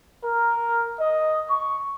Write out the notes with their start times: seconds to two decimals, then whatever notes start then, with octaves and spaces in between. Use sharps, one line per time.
0.24 A#4
0.97 D#5
1.49 C#6